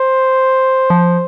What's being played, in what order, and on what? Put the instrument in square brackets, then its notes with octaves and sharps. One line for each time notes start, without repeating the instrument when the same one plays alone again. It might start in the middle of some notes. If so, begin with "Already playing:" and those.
Already playing: [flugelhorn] C5
[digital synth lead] F3